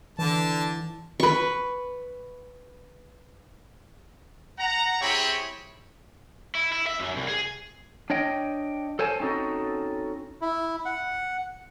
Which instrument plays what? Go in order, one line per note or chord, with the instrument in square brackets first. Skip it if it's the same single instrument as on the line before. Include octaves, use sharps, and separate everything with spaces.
[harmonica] D3 A5 [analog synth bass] E3
[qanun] B4 C#6
[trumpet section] F#5 A#5
C4 E4 G4 G#4 C#5 B5
[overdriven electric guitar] E4
E4
E5
F#2
C2
G#4
[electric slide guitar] D4 C#5 D#5 G5
A4 C5 C#5 G#5 A5
C4 C#4 D#4 F#4 A4
[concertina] E4
F#5